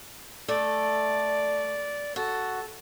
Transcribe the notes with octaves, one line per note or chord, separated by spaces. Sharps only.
A3 D5
F#4 A4